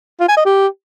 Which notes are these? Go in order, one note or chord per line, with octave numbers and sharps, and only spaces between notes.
F4
G#5
D#5
G4